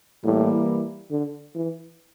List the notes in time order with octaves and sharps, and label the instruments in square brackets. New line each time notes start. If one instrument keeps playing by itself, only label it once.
[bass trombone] A2 [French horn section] E3 G3 A#3 E4 A#4
[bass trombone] D3
E3